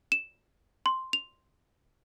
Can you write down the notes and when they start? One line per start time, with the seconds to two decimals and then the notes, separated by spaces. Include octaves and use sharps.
0.12 E7
0.86 C6
1.13 F7